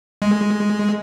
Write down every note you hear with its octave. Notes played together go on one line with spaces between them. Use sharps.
G#3